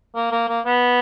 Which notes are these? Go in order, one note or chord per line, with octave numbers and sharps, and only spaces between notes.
A#3
A#3
A#3
B3